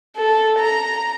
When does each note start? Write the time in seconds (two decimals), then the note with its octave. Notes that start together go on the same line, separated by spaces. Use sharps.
0.16 A4
0.60 A#5